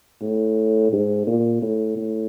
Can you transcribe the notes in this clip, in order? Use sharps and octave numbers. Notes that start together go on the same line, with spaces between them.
A2
G#2
A#2
A2
A2